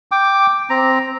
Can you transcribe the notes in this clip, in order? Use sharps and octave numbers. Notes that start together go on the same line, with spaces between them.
G5 D6
C4 A#5